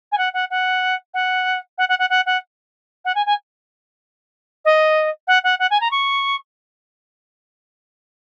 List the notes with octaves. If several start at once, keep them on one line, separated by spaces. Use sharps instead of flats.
G#5
F#5
F#5
F#5
F#5
F#5
F#5
F#5
F#5
F#5
F#5
G#5
G#5
D#5
F#5
F#5
F#5
G#5
A#5
C#6